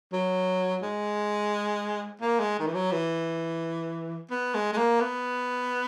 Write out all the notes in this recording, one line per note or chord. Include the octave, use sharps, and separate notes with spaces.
F#3
G#3
A#3
G#3
D#3
E3
F#3
E3
B3
G#3
G#3
A#3
B3